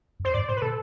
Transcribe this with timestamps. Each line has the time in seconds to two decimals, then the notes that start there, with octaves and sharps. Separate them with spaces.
0.20 F2
0.25 C5
0.34 G#2 D5
0.48 A2 C5
0.57 B4
0.62 B2 A4